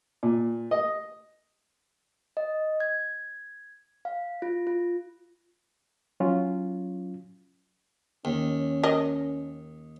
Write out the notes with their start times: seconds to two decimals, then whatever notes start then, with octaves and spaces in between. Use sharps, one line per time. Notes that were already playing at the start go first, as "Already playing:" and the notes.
0.23 A#2
0.71 D#5
2.37 D#5
2.80 G#6
4.05 F5
4.42 F4
4.67 F4
6.20 F#3 C#4 F4
8.25 D#2 C#4
8.83 A#4 D#5